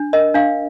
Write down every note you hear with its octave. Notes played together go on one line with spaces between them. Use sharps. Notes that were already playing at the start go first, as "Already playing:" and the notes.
Already playing: D4
A#4 D#5
D4 F5